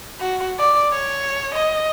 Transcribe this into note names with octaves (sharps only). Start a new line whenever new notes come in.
F#4
D5
C#5
D#5